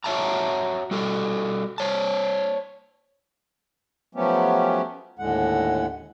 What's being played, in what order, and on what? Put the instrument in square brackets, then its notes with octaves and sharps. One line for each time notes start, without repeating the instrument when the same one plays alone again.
[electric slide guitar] F#4 C#5 D5 E5 A5 A#5
G3 F#4 A4
C5 C#5 A5
[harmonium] F3 F#3 A3 B3 C#4 G4
D#2 A2 D3 G#3 F#5